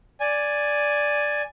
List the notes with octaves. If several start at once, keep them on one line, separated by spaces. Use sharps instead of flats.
D5 G#5